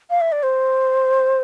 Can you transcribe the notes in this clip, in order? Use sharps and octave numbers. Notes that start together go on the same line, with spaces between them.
F5
E5
D5
C5